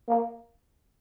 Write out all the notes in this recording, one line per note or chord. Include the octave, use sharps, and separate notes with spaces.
A#3